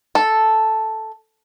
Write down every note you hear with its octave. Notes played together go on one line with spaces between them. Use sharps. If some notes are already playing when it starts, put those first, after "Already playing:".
A4